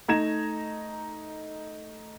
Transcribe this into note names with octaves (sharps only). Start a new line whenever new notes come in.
A3 D#4 A#5 G#6 A#6 E7